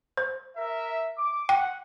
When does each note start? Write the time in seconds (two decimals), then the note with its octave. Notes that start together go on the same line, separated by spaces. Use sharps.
0.17 C5
0.56 A#4 E5
1.17 D6
1.49 F#5 G5